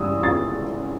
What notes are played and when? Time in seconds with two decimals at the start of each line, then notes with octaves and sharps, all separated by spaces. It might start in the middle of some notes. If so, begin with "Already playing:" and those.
Already playing: G2 E3 C#4 D#6 E6
0.23 A6